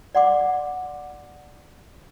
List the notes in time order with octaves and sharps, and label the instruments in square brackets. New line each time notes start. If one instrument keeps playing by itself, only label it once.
[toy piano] D5 F#5 C6 D6